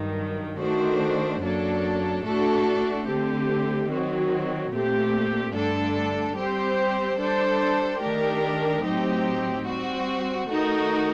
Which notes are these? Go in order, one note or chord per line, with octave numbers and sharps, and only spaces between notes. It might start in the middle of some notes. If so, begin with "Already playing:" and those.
Already playing: G2 D#3 F#3
D#3 A3 D4 F#4 C5
F#2 F#3 A#3 D4 A4
A2 A3 D4 F#4 A4
D3 A3 C4 G4
D#3 F#3 C4 F#4
A#2 A3 C4 G4
G2 D3 A3 D4 A4
G3 C4 G4 C5
G3 D4 A4 C5
D#3 A3 D4 G4 A#4
A2 F#3 C4 D#4 G4
G3 C4 F#4
D#3 A3 D#4 F#4 A#4